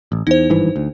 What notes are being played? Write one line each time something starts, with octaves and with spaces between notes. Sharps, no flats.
A1
E2 D#4 C5
G#1 G2 E3
D2